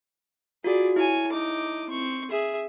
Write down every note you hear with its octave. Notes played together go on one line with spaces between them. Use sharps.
F4 F#4 G#4 D5
E4 C#5 G#5
D#4 D6
C4 C#6
G#4 E5